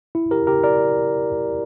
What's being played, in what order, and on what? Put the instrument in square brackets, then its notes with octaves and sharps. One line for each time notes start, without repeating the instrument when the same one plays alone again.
[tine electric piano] E4
G4 A#4
G4 A#4
A#4 D5